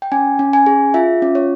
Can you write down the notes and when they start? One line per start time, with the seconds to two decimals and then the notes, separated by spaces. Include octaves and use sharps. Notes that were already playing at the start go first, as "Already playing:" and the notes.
0.02 G5
0.12 C#4 G#5
0.39 C#4
0.53 G#5
0.66 G#4
0.94 F4 E5
1.22 C#4
1.35 C#5